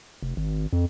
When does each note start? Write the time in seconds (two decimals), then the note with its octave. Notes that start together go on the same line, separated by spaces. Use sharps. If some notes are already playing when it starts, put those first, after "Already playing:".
0.22 F1
0.37 G#1
0.73 F2